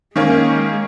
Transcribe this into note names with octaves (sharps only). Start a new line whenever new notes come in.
D#3 G#3 A#3 C#4